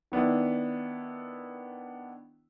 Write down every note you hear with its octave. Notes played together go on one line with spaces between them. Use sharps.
D#3 B3 D4 E4